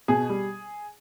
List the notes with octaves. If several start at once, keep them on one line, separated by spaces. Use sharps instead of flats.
B2 G#4
G3